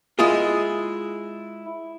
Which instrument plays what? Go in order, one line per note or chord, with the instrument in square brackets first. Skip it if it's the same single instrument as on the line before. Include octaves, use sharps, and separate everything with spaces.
[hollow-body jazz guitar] G#3 E4 F4 G#4